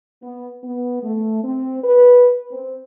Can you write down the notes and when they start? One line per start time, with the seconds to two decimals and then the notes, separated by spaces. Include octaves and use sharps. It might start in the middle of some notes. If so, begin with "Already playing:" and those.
0.22 B3
0.64 B3
1.03 A3
1.44 C4
1.84 B4
2.52 C4